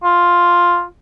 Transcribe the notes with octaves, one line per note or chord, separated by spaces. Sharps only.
F4